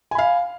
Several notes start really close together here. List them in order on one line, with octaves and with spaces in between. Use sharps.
G#5 B5 F5